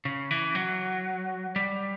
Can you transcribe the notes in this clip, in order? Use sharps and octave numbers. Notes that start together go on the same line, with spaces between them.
C#3
E3
F#3
G3